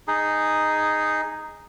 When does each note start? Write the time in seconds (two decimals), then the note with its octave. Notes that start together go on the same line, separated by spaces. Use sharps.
0.07 D#4 G#4